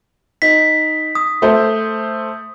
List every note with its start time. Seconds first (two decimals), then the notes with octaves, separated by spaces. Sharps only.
0.42 D#4 B6
1.15 D#6
1.42 A3 C5